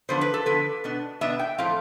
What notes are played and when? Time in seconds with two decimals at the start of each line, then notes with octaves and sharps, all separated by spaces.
0.09 D3 F3 B3 D4 C5
0.21 B4
0.34 A4
0.46 D3 F3 B3 D4 B4
0.84 B2 B3 D4
1.21 B2 B3 D4 E5
1.39 G5
1.58 A2 F3 A3 C4 F5